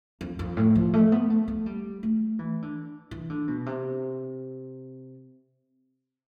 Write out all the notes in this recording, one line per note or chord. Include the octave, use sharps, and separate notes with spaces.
F2
F2
A2
F3
A3
B3
A3
A3
G3
A3
E3
D3
E3
D3
B2
C3